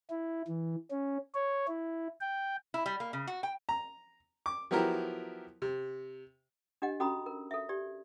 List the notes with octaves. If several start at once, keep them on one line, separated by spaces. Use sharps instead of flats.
E4
E3
C#4
C#5
E4
G5
E4
G3
A#3
C#3
F#4
G5
A#5
D6
F3 F#3 B3 E4 G4 A#4
C3
D4 G4 D#5 F#5
C#4 F#4 A4 A#5 B5 D#6
A#4
A4 E5
G4 D5